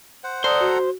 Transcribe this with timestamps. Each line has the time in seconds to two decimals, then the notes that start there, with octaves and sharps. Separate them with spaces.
0.24 C5 F#5
0.44 A4 C5 D5 F#5 A#5 D#6
0.61 F#4